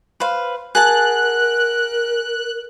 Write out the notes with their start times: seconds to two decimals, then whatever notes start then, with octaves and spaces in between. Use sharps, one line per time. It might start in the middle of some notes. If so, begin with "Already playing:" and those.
0.20 B4 C5 F5
0.75 G#4 A#4 F#5 A5 F#6